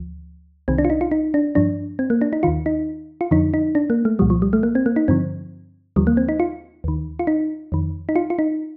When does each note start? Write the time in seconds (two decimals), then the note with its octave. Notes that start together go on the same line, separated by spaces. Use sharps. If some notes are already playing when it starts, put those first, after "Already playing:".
Already playing: D2 F3
0.68 C2 C3 D#3 C4
0.78 D4
0.85 F4
0.90 D#4
1.01 F4
1.11 D#4
1.34 D4
1.55 G2 F3 D4
1.99 C4
2.10 A#3
2.21 D4
2.33 D#4
2.43 D#2 D#3 F4
2.66 D#4
3.21 F4
3.31 F2 D3 F3 D#4
3.54 D#4
3.75 D4
3.90 A#3
4.05 A3
4.19 C2 A#2 F3 G3
4.30 F3
4.42 G3
4.53 A3
4.63 A#3
4.75 C4
4.86 A#3
4.96 D#4
5.08 G2 D3 F3 C4
5.96 D#2 D3 F3 G3
6.07 A#3
6.17 C4
6.29 D#4
6.40 F4
6.84 D#2 D#3
7.19 F4
7.27 D#4
7.72 F2 D#3
8.09 D#4
8.16 F4
8.30 F4
8.39 D#4